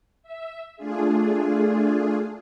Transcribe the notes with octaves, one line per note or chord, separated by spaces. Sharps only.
E5
A3 D4 F4 G#4